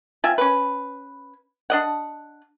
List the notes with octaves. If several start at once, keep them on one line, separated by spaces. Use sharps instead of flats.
C4 F4 E5 G#5
C#4 B4
D4 D#5 F#5